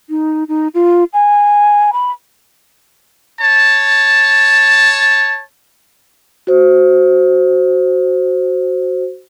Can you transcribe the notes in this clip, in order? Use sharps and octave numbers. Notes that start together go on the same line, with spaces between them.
D#4
D#4
F4
G#5
B5
C#5 A5
F#4 C5